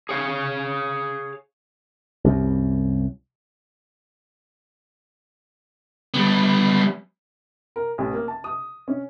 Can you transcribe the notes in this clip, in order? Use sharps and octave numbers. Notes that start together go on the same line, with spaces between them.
G#4 C#5 F5
C2 F#2
G3 B3
A#4
A1
A#3
A5
D#6
C#4